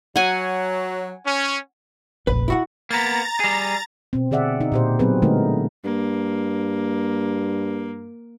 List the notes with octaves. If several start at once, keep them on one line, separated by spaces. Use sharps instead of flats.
F#3 F#5 G#5
C#4
F1 A#1 B4
E4 F#4 F#5
A#3 B3 A#5 A6
G3 G#4
B2 C4
D3 G#4 D5 E5 F#5
D#4
A#2 G4 C5
F#3 B3 C4 G#4 B4
D3 G#3 A3 D#4 A#4
G2 A#3